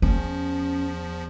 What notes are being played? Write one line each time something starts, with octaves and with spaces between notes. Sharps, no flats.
E2 F3 C#4